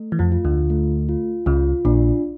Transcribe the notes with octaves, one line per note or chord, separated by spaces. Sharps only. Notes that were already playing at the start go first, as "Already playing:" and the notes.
Already playing: A3
E3
F2 F3
F4
D2 D3
A3
F4
C#2 C#3 F4
A#1 A#2 D4